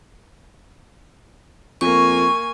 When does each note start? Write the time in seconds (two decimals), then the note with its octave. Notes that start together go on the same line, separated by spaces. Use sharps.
1.81 F2 A#3 G#5 C#6